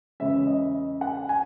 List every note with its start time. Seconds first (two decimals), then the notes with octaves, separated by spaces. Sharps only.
0.20 E2 C#3 G#3 C#4 E5
0.47 D#5
1.01 F#5
1.29 G#5